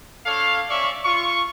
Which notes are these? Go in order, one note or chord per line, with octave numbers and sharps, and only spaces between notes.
D4 A4 C#5 F5
C#4 D5 E5 F5 C#6
F4 C#6